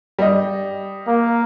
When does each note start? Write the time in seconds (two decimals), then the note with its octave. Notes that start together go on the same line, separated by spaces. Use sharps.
0.19 G3 D#5
1.07 A#3